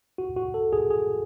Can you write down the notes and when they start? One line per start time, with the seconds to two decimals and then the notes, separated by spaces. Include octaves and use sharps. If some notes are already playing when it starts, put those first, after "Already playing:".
0.18 F#4
0.37 F#4
0.54 A4
0.73 G#4
0.90 G#4